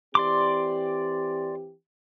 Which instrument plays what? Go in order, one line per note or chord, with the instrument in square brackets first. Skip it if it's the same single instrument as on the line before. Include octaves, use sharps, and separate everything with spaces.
[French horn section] E3 C4 G4 [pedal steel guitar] D5 C6 D6